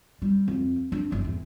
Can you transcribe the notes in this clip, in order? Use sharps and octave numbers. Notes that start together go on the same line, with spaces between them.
G3
F2
D4
G1
E2